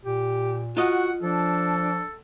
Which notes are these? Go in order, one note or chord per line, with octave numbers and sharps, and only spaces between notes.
A#2 G4
F4 F#4 D#5 F#5
F3 D4 A4